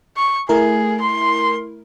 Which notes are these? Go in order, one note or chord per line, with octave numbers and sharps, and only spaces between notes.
C#6
A3 E4 G#4 A#4
C6